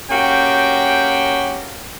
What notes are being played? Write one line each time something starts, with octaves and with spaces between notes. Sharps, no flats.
A#3 C#4 F#4 G4 G5